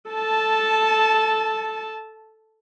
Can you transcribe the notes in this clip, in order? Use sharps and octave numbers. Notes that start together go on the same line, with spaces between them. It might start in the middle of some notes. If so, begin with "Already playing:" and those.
A4 A5